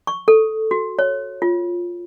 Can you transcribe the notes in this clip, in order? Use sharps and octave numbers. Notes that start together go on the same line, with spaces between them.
C#6
A4
F#4
C#5
F4